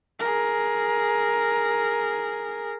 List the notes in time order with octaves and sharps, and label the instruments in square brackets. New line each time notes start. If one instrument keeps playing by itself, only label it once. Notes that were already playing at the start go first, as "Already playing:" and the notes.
[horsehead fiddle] G#4 A#4